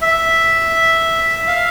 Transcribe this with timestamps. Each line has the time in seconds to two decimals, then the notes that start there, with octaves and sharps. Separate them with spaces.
0.01 E5
1.48 F5